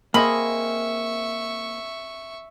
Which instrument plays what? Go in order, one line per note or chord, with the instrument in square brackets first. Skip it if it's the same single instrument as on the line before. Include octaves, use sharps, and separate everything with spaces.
[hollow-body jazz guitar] A#3 [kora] C4 G#4 D#5 [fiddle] E5 C#6 [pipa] B5